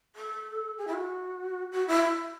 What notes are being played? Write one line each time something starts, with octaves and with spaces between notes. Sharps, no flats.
A4
G#4
E4
F#4
F#4
E4